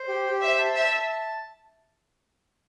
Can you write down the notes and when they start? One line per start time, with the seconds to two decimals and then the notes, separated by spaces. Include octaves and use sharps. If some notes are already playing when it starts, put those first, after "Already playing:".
Already playing: C5
0.08 G4
0.26 G4
0.42 C5 E5
0.58 A5
0.75 E5 A5
0.93 A5
1.10 A5